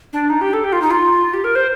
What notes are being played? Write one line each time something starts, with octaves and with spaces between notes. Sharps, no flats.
D4
D#4
G4
A4
G4
F4
D#4
F4
G4
A#4
C5